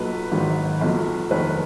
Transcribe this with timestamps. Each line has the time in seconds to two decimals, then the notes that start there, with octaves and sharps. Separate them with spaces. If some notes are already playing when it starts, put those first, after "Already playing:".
Already playing: B1 A#2 F#3 B4
0.31 G#1 G#2 D#3 F#3
0.81 B1 A#2 F#3
1.30 F1 D#2 D#3 F#3 B4